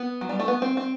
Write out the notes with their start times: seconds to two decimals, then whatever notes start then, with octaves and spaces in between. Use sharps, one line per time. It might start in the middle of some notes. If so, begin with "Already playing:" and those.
Already playing: B3
0.21 F#3
0.29 G3
0.39 A3
0.48 B3
0.62 C4
0.77 C4